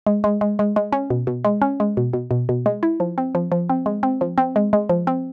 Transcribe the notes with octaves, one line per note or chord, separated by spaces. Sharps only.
G#3
G#3
G#3
G#3
G#3
C#4
B2
B2
G#3
C#4
G#3
B2
B2
B2
B2
G#3
E4
F3
C4
F3
F3
C4
G#3
C4
F3
C4
G#3
G#3
F3
C4